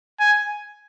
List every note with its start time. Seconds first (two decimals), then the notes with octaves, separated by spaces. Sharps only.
0.20 G#5